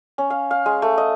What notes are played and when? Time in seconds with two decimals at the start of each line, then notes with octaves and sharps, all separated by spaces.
0.18 C#4
0.30 F5
0.51 F5
0.66 G#3
0.82 A3
0.98 D#5